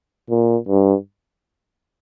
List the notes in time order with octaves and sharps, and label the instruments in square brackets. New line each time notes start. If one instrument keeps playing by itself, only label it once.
[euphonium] A#2
G2